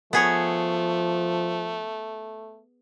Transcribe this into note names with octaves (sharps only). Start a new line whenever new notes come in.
F3 A3 B3 G#4 C#5